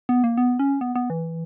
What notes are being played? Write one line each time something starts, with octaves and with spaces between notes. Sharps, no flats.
B3
A#3
B3
C#4
B3
B3
E3